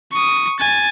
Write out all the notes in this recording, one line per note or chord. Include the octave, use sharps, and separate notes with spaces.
C#6 D#6
G#5 A6